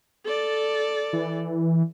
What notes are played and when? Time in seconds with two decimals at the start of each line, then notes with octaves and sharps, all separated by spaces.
0.25 A4 D5
1.13 E3